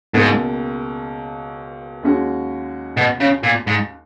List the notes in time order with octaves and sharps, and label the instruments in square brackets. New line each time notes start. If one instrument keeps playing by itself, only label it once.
[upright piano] C#2 B2 A#3 [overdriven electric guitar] G#2
[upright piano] D#2 D#3 G#3 C#4 F#4
[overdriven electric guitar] B2
C#3
A#2
G#2